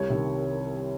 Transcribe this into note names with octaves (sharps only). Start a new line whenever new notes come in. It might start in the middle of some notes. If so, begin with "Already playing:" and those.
Already playing: C2 C#5
C3 D#3